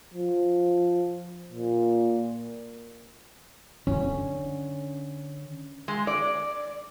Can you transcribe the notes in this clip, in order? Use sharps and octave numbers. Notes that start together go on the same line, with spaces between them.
F3
A#2
D3 C#4
G#3
D5